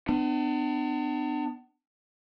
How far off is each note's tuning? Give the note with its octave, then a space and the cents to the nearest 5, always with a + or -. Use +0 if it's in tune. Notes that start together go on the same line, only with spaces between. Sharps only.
B3 +40 D4 +35